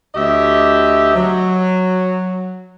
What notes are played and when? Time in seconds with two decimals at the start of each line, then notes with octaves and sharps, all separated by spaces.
0.15 D2 G4 D#5 E5
1.15 F#3